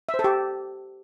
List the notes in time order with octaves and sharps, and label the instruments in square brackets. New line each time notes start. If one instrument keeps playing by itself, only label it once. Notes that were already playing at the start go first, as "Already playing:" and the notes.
[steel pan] E5
C5
A4
G4